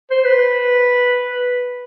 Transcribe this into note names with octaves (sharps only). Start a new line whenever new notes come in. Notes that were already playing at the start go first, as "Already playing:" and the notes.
C5
B4